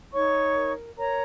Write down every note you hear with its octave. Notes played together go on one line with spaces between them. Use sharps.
D#4 C#5 C#6
A#4
A#4 C#5 A#5